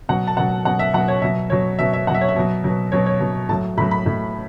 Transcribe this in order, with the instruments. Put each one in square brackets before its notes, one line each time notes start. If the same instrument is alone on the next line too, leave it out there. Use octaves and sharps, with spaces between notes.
[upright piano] B2 F#3 F#5
A5
B2 F#3 F#5
B2 F#3 F#5
E5
F#3 F#5
B2
C#5
B2 F#3 E5
B2 F#3 C#5
B2 F#3 E5
E5
B2 F#5
F#3 E5
C#5
E5
B2 F#3
B2 F#3
B2 F#3 C#5
C#5
B2 F#3
A2 A5
F#3
A2 B5
F#3
B5
A2 F#3